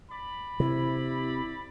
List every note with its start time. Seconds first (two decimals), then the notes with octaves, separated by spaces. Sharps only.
0.11 D5 B5
0.60 C3 E4